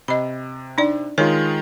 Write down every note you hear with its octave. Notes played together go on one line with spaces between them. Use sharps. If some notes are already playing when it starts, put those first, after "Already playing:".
C3 D#5 B5
D4 D#4 D5
D#3 G#3 F4 C#5